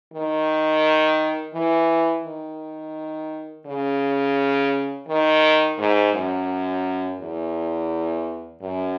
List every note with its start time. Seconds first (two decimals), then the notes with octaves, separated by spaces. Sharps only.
0.13 D#3
1.54 E3
2.24 D#3
3.66 C#3
5.08 D#3
5.78 G#2
6.14 F#2
7.20 E2
8.62 F#2